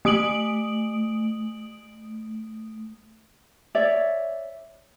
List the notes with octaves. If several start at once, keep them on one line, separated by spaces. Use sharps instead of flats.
A3 D#6 D7 F#7
C#5 D5 E5